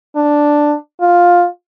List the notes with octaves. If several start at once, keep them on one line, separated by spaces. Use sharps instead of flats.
D4
F4